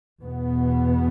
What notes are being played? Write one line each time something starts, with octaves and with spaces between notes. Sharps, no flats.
E2 B2 B3